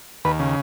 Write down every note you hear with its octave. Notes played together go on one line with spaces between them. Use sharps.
D#2 B4
C#3